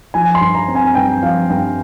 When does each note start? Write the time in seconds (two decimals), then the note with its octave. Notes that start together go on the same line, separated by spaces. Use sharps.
0.14 F3 G#5
0.35 C6
0.41 G2
0.55 A#5
0.68 C4
0.75 G#5
0.95 G2 G5
1.22 F3 F5
1.49 G2 G5